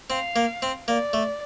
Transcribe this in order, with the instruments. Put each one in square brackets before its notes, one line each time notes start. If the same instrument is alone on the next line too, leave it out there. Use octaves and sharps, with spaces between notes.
[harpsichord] C4 [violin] F5
[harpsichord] A#3
C4
[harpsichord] A#3 [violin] D5
[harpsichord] A3